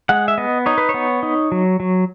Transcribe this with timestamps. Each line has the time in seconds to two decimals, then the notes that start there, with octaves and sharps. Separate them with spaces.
0.09 G#3 F#5
0.28 E5
0.38 B3 D#5
0.66 D#4 C#5
0.78 B4
0.89 C#5
0.94 B3
1.23 D#4
1.52 F#3
1.80 F#3